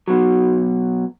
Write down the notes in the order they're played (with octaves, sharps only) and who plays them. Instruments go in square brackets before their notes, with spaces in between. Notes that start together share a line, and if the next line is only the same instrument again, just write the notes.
[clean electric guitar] B2 F#3